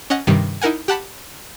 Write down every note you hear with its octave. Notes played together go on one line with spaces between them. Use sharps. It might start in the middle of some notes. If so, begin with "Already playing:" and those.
C#4 D#5 F#5
G2 C3 D#3 G3
D#4 E4 A#4 F#5 G#5
G4 F#5 A5 B5